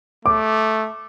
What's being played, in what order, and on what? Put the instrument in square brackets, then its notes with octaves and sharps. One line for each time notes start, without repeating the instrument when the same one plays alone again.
[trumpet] A3 [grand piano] D6